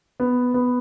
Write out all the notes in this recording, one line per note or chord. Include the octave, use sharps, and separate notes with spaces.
B3
B3